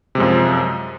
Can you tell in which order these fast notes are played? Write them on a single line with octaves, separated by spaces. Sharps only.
C3 G#3 F#2 F3